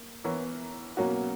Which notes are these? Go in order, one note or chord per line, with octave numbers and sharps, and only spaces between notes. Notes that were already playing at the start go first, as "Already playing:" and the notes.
Already playing: A#3
E3 B3 E4 A#4 C#5
B2 F#3 A#3 C#4 F#4